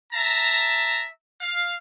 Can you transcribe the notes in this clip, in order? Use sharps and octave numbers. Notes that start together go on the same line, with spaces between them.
E5 A5 A#5
F5